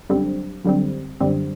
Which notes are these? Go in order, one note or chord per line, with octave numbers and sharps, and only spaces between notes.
F#2 D3 G3 C4
F#2 D3 G3 C4
F#2 D3 G3 C4